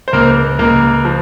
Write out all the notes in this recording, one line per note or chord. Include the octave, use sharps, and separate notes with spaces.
C5
C#2 A#3 A#4
C#2 A#3 A#4
F3